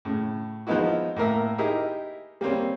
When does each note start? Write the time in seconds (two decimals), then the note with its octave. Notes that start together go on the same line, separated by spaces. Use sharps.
0.05 A2 C#3
0.67 F3 G#3 B3 D#4 E4 F#4
1.16 A2 A#3 A#4 E5
1.58 D#4 E4 G4 G#4 A#4 E5
2.41 G3 A#3 C4 C#4